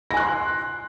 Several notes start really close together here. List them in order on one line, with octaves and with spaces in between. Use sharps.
A#6 G#5 F#6 C6